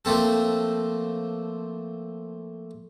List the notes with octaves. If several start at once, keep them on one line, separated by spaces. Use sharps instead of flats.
F3 A3 A#3 C4 A4